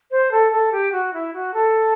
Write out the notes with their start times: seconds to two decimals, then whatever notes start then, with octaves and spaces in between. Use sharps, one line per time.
0.11 C5
0.31 A4
0.52 A4
0.72 G4
0.92 F#4
1.14 E4
1.34 F#4
1.54 A4